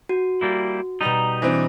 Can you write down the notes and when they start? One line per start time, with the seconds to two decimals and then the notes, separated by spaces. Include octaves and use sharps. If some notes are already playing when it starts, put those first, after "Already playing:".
0.09 F#4
0.41 G3 A#3 E4
1.01 B2 G3 D#4 A#5 E7
1.42 E3 C4 D4 A#6